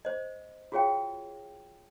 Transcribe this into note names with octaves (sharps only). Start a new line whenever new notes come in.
C5 D#5
F4 F#4 G#4 C#5 F5 G5